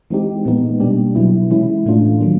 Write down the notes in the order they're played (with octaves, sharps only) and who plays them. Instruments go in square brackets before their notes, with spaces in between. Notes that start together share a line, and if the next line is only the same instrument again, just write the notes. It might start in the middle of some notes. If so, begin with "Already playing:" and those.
[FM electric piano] E3 G#3 C4 D#4 G4
A#2 F3 G#3 B3 D#4
B2 G3 A#3 D4 G4
B2 F#3 B3 E4
C3 E3 G#3 C#4 E4
A2 E3 A3 D4 F4
D#3 F#3 A#3